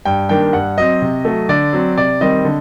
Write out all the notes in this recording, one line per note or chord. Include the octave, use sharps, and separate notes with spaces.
G2 G5
D#3 G3 A#3 D4 G5
G2 F#5
F#3 C4 D#5
C3
F#3 A3
D3 D5
F#3 C4
C3 D5
D#3 G3 C4 D#5
D3